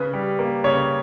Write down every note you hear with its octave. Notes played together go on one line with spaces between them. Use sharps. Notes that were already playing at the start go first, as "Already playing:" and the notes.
Already playing: C#3 B4
G3
A#3
C#3 C#5